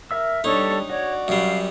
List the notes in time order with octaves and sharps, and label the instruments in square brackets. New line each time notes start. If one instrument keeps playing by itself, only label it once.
[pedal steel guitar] A#4 E5 E6
[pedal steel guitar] G3 [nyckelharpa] D4 C#5 [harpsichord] D#4 [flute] A4
[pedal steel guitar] F#4 [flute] C#5 [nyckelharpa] D5
[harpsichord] F#2 G3 [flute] F5